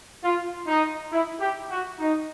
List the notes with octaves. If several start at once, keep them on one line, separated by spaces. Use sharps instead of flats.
F4
D#4
E4
G4
F#4
D#4